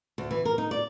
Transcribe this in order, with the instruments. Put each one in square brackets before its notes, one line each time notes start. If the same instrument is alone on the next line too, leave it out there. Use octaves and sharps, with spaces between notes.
[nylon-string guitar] D2
E3
A#4
D#4
D5